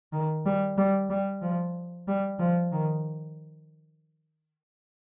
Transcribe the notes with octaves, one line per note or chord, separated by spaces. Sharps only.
D#3
G3
G3
G3
F3
G3
F3
D#3